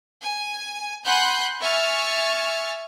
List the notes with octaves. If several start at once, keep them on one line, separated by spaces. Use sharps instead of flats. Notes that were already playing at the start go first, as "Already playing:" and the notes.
G#5
F#5 G#5 B5 C6 F#6 G6
E5 G#5 C#6 F6 A6